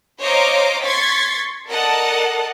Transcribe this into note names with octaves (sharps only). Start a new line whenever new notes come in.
C5 C#5 D#5 F5 A#5 D6
C6 C#6 G#6 A6 B6
A4 A#4 D5 D#5 F#5 A5